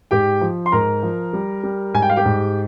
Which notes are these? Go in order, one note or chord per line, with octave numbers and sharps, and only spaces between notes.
G#2 G4 G5
F3
C6
G#2 A#4 A#5
F3
G3
G3
G#2 G#5
G5
F5
G4 G5
G#2